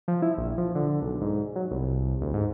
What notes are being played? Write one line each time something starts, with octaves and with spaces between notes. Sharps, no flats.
F3
E4
A#1
F3
D3
B1
G#2
F#3
C2
D2
G#2